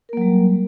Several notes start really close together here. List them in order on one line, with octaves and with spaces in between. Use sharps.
A#4 A#3 F#3 G3